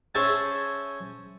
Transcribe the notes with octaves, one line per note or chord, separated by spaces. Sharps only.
C#4 G#4 C5 E5 G#5 A5